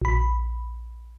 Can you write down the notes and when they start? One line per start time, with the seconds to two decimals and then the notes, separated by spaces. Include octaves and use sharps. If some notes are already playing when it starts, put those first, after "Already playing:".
0.02 A#1 B5